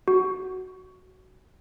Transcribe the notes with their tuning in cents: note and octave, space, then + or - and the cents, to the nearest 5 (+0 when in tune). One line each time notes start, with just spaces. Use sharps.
F#4 +10